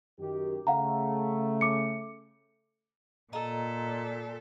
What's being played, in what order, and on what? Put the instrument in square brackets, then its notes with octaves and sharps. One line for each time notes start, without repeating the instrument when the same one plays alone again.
[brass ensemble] F#2 D#3 G4
[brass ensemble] C#3 A3 [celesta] F5 F#5 A#5
[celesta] D6 C#7
[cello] A#2 [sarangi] A4 [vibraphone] D#5 A#5